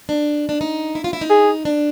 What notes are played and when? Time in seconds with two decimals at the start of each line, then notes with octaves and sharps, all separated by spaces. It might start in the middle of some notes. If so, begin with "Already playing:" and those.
0.09 D4
0.49 D4
0.61 D#4
0.95 E4
1.04 F4
1.13 E4
1.21 D#4
1.30 G#4
1.65 D4